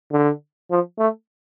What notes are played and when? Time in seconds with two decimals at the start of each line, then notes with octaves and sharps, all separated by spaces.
0.12 D3
0.71 F3
0.99 A3